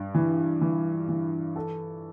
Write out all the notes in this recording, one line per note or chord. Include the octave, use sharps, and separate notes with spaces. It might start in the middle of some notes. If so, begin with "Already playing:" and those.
Already playing: G2
E3
E3
E3
A4